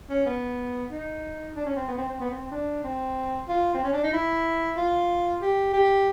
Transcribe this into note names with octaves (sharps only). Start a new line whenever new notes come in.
C#4
B3
D#4
D4
C#4
C4
B3
C4
C4
B3
C4
C4
D4
C4
F4
C4
C#4
D4
D#4
E4
F4
G4
G4